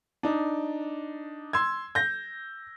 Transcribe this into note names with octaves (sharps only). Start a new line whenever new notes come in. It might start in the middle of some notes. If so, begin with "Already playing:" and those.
D4 D#4
C6 E6 G#6
G6 A#6